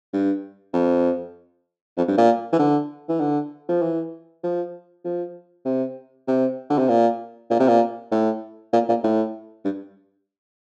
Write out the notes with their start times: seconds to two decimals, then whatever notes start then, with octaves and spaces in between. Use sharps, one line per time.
0.13 G2
0.73 F2
1.97 F2
2.08 G2
2.18 A#2
2.53 E3
2.59 D3
3.08 E3
3.20 D3
3.69 F3
3.82 E3
4.43 F3
5.05 F3
5.65 C3
6.28 C3
6.70 D3
6.79 C3
6.89 A#2
7.50 A#2
7.59 C3
7.68 A#2
8.12 A2
8.73 A#2
8.89 A#2
9.04 A2
9.65 G2